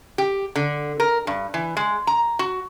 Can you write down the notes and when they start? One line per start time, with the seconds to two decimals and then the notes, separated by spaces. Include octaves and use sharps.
0.18 G4
0.56 D3
1.00 A#4
1.27 G2
1.54 E3
1.77 G#3
2.07 A#5
2.39 F#4